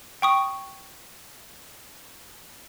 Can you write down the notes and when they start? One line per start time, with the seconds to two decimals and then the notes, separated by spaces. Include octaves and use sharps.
0.22 G5 C#6 D#6